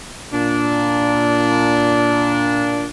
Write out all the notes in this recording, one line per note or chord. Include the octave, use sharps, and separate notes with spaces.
A#2 D4